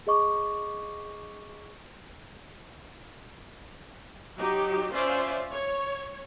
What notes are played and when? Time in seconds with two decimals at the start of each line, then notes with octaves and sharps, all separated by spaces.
0.07 G#4 D#5 C#6 D6
4.38 F#3 D#4 G4
4.93 C#4 F4 C5 D5 E5
5.52 C#5